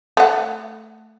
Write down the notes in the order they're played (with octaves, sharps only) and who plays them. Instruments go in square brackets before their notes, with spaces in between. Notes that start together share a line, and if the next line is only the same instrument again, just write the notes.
[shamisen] A3 F#5